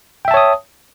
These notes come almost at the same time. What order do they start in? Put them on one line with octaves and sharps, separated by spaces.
G5 E5 A5 C#5 D#6